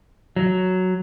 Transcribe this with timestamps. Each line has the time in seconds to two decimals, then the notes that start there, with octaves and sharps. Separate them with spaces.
0.36 F#3